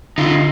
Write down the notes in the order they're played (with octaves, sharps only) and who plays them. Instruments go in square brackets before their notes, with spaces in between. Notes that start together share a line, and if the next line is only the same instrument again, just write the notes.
[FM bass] D3 [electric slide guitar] D#4 F4